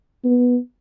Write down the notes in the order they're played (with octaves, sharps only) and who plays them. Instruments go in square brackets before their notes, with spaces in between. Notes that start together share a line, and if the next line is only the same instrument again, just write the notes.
[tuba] B3